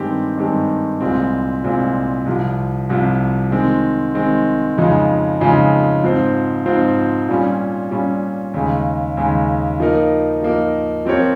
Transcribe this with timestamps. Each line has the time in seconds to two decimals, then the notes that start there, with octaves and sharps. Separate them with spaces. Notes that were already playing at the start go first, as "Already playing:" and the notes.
Already playing: G2 D#3 G#3 C4 G4
0.37 G2 D#3 G#3 C4 G4
1.00 C2 A#2 G#3 C4
1.64 C2 A#2 G#3 C4
2.26 C2 C3 F3
2.90 C2 C3 F3
3.51 D#3 G#3 C4
4.15 D#3 G#3 C4
4.78 F2 C#3 F3 G#3 D#4
5.41 F2 C#3 F3 G#3 D#4
6.04 G#2 F3 C4 F4 C5
6.66 G#2 F3 C4 F4 C5
7.28 A#2 G3 C#4 F4
7.91 A#2 G3 C#4 F4
8.54 D#2 C#3 G#3
9.17 D#2 C#3 G#3
9.80 F3 A#3 D#4 A#4
10.42 F3 A#3 D#4 A#4
11.06 F3 C4 G4 A#4 C#5